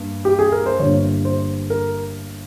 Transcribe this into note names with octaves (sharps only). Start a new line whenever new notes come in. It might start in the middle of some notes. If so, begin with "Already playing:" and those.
Already playing: G2 A#3
G4
G#4
A#4
C5
G1 G2 G3 A#3 C#5
C5
A#4